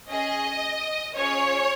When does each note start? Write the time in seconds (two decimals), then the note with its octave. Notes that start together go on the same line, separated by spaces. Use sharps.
0.11 C#4 G#4 D#5
1.16 C#4 F4 G#4 C#5